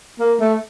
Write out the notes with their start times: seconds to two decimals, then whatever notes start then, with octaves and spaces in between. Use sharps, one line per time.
0.20 A#3
0.40 A3